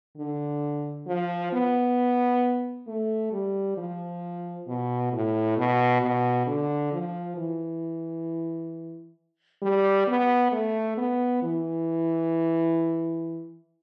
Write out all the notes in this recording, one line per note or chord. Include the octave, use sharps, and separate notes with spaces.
D3
F3
B3
A3
G3
F3
B2
A2
B2
B2
D3
F3
E3
G3
B3
A3
B3
E3